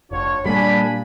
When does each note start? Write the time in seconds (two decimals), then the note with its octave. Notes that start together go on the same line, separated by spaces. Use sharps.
0.11 F1 D4 F4 C#5
0.45 A#2 G3 A#3 D4 G#5 B5